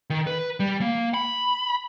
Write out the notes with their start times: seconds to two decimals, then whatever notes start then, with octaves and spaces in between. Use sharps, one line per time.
0.10 D#3
0.27 B4
0.60 G3
0.81 A#3
1.14 B5